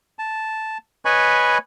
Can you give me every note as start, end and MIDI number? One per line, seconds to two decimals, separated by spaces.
0.19 0.78 81
1.05 1.58 71
1.05 1.58 73
1.05 1.58 75
1.05 1.58 80
1.05 1.58 83
1.05 1.58 85